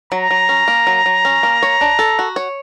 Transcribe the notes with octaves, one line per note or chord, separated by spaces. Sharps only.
F#3 A#5
F#3
C#4
A#3
F#3
F#3
C#4
A#3
C#5
D4
A4
F#4
C#5